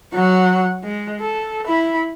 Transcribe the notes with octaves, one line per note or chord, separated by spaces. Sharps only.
F#3 F#5
G#3
A4
E4 B5